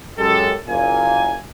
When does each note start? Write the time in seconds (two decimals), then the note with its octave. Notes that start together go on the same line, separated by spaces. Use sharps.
0.18 F#2 G#3 G4 A4
0.67 F#1 A#2 A#3 G#5